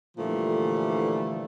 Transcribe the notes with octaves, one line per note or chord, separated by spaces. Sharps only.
A#2 D3 E3 F3 G3 A3